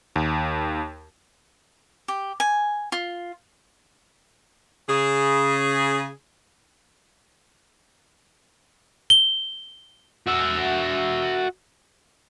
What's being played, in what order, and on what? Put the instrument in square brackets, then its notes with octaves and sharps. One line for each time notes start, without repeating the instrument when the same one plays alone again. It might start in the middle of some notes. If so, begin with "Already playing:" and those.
[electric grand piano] D#2
[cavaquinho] G4
G#5
F4
[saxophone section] C#3 G#4
[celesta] G7
[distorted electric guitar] F#4 E5